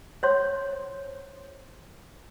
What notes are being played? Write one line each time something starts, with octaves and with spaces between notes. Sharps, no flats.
C5 C#5 C6